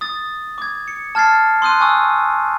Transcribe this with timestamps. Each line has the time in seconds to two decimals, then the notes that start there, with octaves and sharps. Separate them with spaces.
0.01 D#6 A6
0.58 D6 G#6
0.88 C#7
1.15 A5 F6 G#6 A6 C7
1.62 C6 D#6 F#6 D#7
1.80 G#5 C#6 D#6 E6